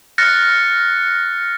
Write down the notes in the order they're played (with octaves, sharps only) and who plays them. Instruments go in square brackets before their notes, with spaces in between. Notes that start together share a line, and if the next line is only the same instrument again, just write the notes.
[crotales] F6 F#6 A6 A#6 C#7